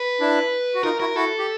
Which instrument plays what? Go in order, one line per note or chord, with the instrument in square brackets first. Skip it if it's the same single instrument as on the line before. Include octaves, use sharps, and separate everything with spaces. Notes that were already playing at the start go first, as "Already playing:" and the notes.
Already playing: [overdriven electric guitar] B4
[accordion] D4 E4
F#4
[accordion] D#4 F4 [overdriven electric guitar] A#4
[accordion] E4 F#4 [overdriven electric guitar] A#4
[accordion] E4 F#4 [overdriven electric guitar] A4
[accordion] G4